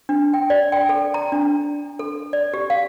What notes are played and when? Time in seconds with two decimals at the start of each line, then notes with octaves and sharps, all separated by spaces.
0.09 D4
0.34 G5
0.50 D5
0.72 G5
0.89 A4
1.14 A#5
1.32 D4
1.99 A4
2.33 D5
2.54 G4
2.70 F5